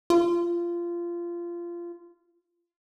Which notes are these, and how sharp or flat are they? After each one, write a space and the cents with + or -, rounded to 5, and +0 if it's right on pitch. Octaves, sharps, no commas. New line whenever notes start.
F4 -20